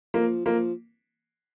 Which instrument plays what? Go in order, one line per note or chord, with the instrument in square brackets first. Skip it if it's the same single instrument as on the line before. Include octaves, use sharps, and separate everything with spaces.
[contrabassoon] F3 [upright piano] A#3
[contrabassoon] F3 [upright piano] A#3